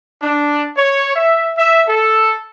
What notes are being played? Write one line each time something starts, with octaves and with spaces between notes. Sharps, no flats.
D4
C#5
E5
E5
A4